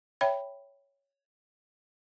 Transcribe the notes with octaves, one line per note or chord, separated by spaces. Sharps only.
C#5 E5 G5 B5